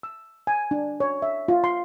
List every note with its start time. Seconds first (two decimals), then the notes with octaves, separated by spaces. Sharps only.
0.03 E6
0.47 G#5
0.71 D4
1.00 C#5
1.22 E5
1.48 F4
1.64 C6